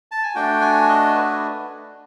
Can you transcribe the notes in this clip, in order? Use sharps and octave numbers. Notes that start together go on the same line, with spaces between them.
A5
G#5
A3 D4 F#4 G5
G#5
D#5
B4